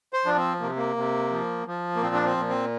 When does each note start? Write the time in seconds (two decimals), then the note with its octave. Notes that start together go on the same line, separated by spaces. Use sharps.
0.13 C5
0.25 F3 D4
0.37 C4
0.60 C3 A#3
0.76 A#3
0.96 C3
1.31 F3
1.67 F3
1.96 A#3
2.02 A#2 C4
2.14 D4
2.25 C4
2.37 A#2
2.49 C4